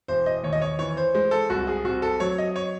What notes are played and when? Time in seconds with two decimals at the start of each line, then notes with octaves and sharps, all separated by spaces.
0.08 E1 C5
0.26 D#5
0.43 D#2 C#5
0.53 D#5
0.62 C#5
0.79 E3 C#5
0.97 C5
1.14 G#3 C5
1.31 A4
1.50 C2 F#4
1.67 G#4
1.84 C3 F#4
2.02 A4
2.20 F#3 C#5
2.38 D#5
2.56 C#5